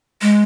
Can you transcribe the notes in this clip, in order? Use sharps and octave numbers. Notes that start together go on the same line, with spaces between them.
G#3